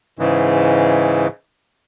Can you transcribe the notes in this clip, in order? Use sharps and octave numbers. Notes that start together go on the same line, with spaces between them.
G#2 C#3 E3 G#3